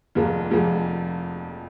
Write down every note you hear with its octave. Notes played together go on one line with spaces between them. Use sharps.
F1 F2 F3 A#3 G#4
F1 F2 F3 A#3 G#4